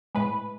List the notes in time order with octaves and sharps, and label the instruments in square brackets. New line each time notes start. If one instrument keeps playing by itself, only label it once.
[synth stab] A2 G#3 B4